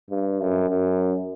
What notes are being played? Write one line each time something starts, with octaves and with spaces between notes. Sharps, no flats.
G2
F#2
F#2